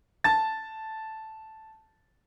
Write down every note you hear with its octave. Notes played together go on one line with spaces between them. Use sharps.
A5 A6